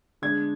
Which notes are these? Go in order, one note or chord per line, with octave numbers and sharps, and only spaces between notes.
D3 G#3 D4 G#6